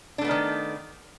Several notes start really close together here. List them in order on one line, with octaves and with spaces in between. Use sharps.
D4 A3 B3 D#4 D#3